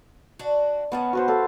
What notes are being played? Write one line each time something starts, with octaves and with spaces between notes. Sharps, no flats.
D4 F#4
D#3 B3 C#4 F#5 A5
F#4 B4 C5
A4 F5